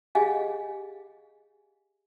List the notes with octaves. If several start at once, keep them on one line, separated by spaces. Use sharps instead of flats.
G4 G#4 D#5 F5 F#5 G#5